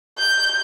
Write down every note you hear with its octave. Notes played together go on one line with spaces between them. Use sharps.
G6